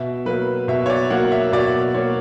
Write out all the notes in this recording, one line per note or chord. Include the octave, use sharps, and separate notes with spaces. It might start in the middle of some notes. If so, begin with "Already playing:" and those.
Already playing: B2 E5
F#3 A#3 B4
B2 E5
C#5
D5
F#3 A#3 F#5
E5
B2 D5
F#3 A#3 C#5